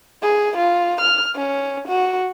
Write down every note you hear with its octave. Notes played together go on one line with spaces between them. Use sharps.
G#4
F4
F6
C#4
F#4